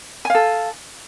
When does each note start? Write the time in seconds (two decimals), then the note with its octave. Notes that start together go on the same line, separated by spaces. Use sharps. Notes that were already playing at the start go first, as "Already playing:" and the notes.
0.25 G#5
0.30 F5
0.35 A4